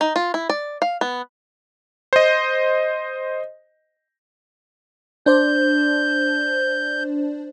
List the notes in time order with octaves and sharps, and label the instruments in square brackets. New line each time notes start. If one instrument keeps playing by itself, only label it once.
[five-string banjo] D#4
F4
E4
D5
F5
B3
[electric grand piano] C5 D#5
[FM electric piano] D4 C5 D5 [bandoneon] G6